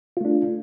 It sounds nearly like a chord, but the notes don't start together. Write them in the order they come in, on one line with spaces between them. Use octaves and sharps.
F4 A3 D4